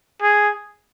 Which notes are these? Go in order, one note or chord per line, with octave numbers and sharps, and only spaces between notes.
G#4